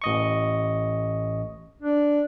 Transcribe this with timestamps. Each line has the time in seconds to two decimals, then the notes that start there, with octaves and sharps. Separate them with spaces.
0.02 A1 D#5 C#6
1.82 D4